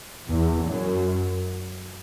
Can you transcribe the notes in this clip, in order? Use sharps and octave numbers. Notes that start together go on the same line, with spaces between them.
E2
F#2